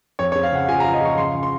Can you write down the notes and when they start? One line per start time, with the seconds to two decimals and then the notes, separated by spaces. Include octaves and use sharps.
0.19 F2 C#5
0.32 C#5
0.36 C4
0.43 F5
0.52 C#3 F#5
0.69 F3 G#5
0.80 A#5
0.85 F3
0.94 D#5
1.01 F3 C#6
1.18 C#3 C6
1.34 C#3
1.43 C6